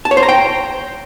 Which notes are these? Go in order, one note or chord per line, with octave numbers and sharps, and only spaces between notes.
A5
C#5
C5
A#5
G5